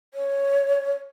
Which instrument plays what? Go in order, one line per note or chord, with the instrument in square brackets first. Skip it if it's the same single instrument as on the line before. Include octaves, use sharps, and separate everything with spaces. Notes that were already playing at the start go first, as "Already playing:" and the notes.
[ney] C#5